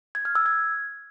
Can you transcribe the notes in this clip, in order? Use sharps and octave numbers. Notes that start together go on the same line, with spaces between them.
G#6
F6
E6
G#6